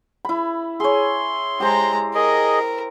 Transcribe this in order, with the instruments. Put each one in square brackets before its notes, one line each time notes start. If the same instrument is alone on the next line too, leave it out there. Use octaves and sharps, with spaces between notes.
[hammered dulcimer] E4 B5
[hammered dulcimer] G#4 C#5 [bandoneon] C6
[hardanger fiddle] G#3 A#5 [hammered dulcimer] G4 C5
[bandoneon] G#4 D#5 [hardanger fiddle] A#4